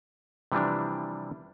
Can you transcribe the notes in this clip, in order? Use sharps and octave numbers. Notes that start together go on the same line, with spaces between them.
C3 E3 F3 G3 D4